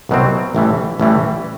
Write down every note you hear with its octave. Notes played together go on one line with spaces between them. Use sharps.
C2 B2 F#3 C4
A1 A2 E3 G3
A1 A2 E3 G3